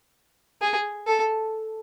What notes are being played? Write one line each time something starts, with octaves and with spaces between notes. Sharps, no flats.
G#4
A4